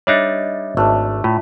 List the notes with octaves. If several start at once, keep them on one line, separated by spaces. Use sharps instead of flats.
G3 D4 D#4 C#5 D#5 E5
G#1 A3 D4
A2 F4